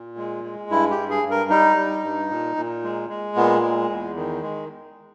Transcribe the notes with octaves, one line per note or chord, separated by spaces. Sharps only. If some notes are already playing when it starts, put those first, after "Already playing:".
Already playing: A#2
G#3
G#3
G2 E4
G4
G2
G#4
G2
A#4
G3 D#4
G3
G2
A#2
A#2
G#3
G#3
A#2 B3
G#3
E2
D#3
G#3